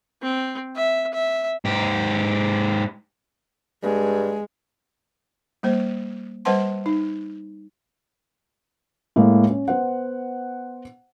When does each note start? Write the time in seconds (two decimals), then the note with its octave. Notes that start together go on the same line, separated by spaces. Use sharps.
0.23 C4
0.76 E5
1.13 E5
1.65 G#2 G4
3.83 G2 G#3
5.63 G3 A#3 C5
6.45 G3 B4 C5 F#5 A5 C6
6.86 D#4
9.16 A2 G#3 A#3
9.50 C#4
9.68 B3 C5 F#5